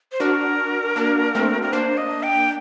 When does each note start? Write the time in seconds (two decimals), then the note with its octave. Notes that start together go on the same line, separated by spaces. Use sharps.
0.12 C5
0.20 D4 F#4 A#4
0.96 A#3 D4
1.35 A3 C4
1.62 A#4
1.73 A#3 D4 C5
1.97 D#5
2.23 G5